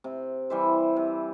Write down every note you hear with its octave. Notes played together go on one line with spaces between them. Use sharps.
C3
E3 G3 C5 E5
C3